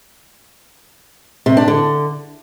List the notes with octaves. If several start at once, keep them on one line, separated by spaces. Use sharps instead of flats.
C3
D4
D3